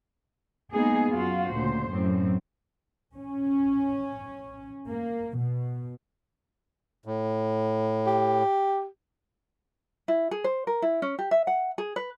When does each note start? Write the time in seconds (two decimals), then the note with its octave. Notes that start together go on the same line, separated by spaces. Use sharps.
0.73 G#3 A#3 B3 D#4 G#4
1.12 F#2 F4 F#4 F5
1.52 D2 A#2 C#3 C5
1.92 F#2 A2 F#3 C4
3.16 C#4
4.89 A#3
5.37 B2
7.06 A2
8.07 G4
10.08 E4
10.31 G#4
10.44 C5
10.67 A#4
10.82 E4
11.02 C#4
11.19 G4
11.31 E5
11.47 F#5
11.78 G#4
11.96 B4